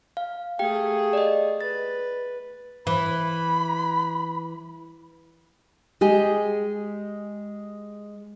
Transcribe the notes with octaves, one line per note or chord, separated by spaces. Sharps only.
F5
A3 G4 G#4 F5 G5
D5 D#5
B4 A6
E3 B5
G#3 G4 G#4